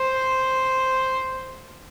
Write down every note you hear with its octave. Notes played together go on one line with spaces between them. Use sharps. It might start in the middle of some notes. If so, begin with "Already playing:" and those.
Already playing: C5